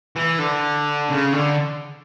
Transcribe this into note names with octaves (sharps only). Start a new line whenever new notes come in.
E3
D3
C#3
D3